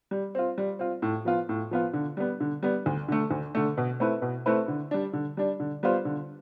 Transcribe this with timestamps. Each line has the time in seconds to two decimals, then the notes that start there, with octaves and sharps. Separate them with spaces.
0.11 G3
0.35 C4 F4
0.58 G3
0.79 C4 F4
1.02 A2
1.25 F3 B3 F4
1.49 A2
1.71 F3 B3 F4
1.94 D3
2.17 G3 B3
2.40 D3
2.63 G3 B3
2.86 D2
3.08 D3 A3
3.31 D2
3.55 D3 A3
3.77 B2
4.00 A3 C4 E4 B4
4.22 B2
4.46 A3 C4 E4 B4
4.68 D3
4.91 G3 D4
5.13 D3
5.37 G3 D4
5.60 D3
5.83 G3 B3 F4 C5
6.05 D3